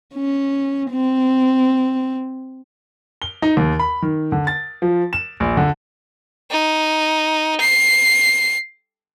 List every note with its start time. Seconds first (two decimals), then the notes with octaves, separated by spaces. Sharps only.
0.14 C#4
0.91 C4
3.22 G7
3.42 D#4
3.57 D#2
3.79 B5
4.02 D#3
4.32 D3
4.47 A6
4.82 F3
5.13 E7
5.40 A#1
5.57 D3
6.51 D#4
7.61 C7